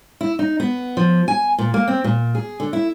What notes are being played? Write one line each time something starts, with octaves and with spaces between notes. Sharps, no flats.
E4
D#4
B3
F3
G#5
A#2
A#3
C4
A#2
G#4
D3
E4